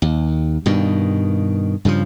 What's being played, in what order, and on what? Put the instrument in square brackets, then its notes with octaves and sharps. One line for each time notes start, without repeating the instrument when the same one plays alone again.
[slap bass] D#2
G2 B2 D#3
G2 C#3 E3 F3